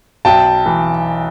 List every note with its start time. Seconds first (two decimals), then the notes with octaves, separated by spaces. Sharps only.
0.25 B1 G5 A5
0.66 E3